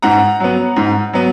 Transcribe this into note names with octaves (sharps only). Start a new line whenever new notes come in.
G#2 F#5 A#5
F#3 B3
G#2
F#3 B3